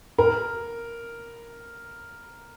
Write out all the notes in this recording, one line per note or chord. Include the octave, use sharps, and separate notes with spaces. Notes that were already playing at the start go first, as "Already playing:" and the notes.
A#4